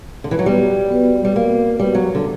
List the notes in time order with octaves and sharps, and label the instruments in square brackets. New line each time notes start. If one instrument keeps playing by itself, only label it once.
[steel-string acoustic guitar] D3
E3
F#3
[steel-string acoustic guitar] G3 [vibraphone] B3 F#4 B4
[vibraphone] B3 F#4 B4
[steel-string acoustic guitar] G3
[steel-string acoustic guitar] A#3 [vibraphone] B3 F#4 B4
[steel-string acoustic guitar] G3 [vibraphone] B3 F#4 B4
[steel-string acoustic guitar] F#3
D3